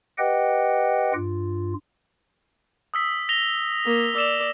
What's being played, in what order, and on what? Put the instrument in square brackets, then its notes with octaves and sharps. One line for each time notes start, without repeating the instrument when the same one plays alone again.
[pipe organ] G4 B4 D#5 F#5 G5
G2 F4
[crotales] D#6 E6 B6
A#6 F7 G7
[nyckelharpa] A#3
[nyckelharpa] D5 [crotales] E6 E7 F7